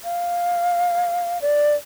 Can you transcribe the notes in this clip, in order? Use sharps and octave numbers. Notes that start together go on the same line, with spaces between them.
F5
D5